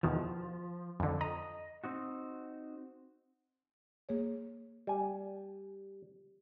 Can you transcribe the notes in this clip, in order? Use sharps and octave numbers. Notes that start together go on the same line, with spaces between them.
E2 B2 D#3 F3
F2 D3
D#5 A#5
C4 D#4 F#4
A#3 G#4 C#5
G3 G#5